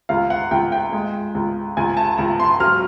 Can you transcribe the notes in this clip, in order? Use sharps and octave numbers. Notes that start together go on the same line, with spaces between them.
C#2 F5
F#5
C#2 G5
G5
G#3
C#2
C#2 G#5
A5
C#2 A#5
C6
F#3 F6